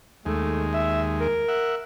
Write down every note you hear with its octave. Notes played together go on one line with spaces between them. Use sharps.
D#2 G#3 A3
E5
A#4
E5 F#5